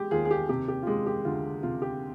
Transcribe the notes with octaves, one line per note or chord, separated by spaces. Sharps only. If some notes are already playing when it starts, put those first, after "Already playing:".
Already playing: G#3 G4
D#2 F4 G#4
G#4
G4
C3 G4
G4
F4
G#3 G4
G4
D2 F4
C3 F4
G4